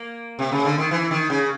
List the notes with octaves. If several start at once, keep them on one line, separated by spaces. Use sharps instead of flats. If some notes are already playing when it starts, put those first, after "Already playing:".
Already playing: A#3
C3
C#3
D3
D#3
E3
D#3
C#3